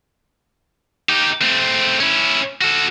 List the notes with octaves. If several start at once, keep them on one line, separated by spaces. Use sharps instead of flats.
D#4 G4
A3 C4
C#4 E4
F#4 A4